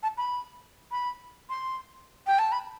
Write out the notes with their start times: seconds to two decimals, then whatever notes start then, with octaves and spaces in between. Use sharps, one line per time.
0.03 A5
0.18 B5
0.91 B5
1.50 C6
2.27 G5
2.39 A5
2.52 B5